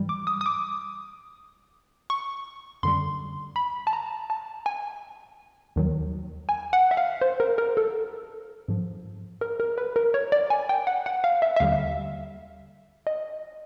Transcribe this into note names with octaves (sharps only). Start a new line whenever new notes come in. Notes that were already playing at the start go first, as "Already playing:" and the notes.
Already playing: G#2 E3 G3
D6
D#6
D#6
D6
C#6
F#2 D3 G3 C6
B5
A5
A#5
A5
G#5
D#2 D#3 F#3
G#5
F#5
E5
F5
C5
A#4
A#4
A4
G#2 F3
A#4
A#4
B4
A#4
C#5
D5
G#5
G5
F#5
F#5
F5
E5
E5
D#2 D3 G3 F5
D#5